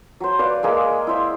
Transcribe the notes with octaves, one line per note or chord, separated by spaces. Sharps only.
F#3 C5
B4 D5 F5
G#3 A#3 G#4 G5
E4 C5 E5